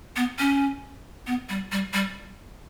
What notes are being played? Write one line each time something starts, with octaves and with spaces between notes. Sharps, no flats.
B3
C#4
B3
G3
G3
G3